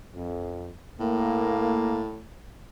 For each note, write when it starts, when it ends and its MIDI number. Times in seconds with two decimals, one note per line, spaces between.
0.15 0.71 41
1.00 2.24 45
1.00 2.03 58